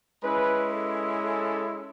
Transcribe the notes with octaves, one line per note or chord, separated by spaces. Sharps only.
G#3 C#4 E4 B4
A4
A4